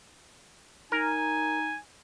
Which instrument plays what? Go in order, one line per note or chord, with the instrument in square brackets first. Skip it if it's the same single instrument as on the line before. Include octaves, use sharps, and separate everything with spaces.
[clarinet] D#4 [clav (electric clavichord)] A#4 [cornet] G#5